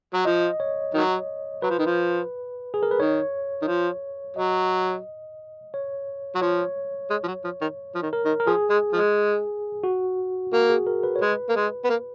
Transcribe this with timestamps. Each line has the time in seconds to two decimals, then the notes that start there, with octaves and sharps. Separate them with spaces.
0.14 F#3
0.25 F3 D#5
0.60 C#5
0.94 D#3 F#3
1.62 F#3 B4
1.70 F3
1.79 D#3
1.86 F3
2.74 G#4
2.83 A#4
2.91 B4
2.99 D#3 C#5
3.62 D#3
3.67 F3
4.36 F#3 D#5
5.74 C#5
6.35 F#3
6.42 F3 C#5
7.10 G#3
7.24 F3
7.27 F#3
7.44 F3
7.61 D#3
7.95 F3
8.02 D#3
8.13 A#4
8.25 D#3
8.40 A#4
8.47 F3 G#4
8.70 G#3
8.93 F3 G#3
9.84 F#4
10.53 A#3 F#4
10.70 G#4
10.87 A#4
11.03 B4
11.16 C#5
11.21 G#3 B4
11.49 A#3
11.56 G#3
11.85 B3
11.90 A#3